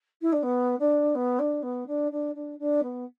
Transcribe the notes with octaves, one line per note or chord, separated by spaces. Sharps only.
E4
D4
B3
D4
B3
D4
B3
D4
D4
D4
D4
B3